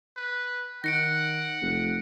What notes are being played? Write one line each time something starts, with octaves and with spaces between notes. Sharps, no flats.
B4
D#3 F#5 A#6 C#7 D7
F1